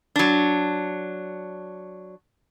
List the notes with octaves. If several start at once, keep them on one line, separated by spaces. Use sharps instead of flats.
F#3 D4